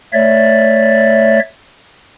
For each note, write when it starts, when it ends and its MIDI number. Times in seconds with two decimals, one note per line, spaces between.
0.13 1.40 57
0.13 1.40 73
0.13 1.40 74
0.13 1.40 76
0.13 1.40 93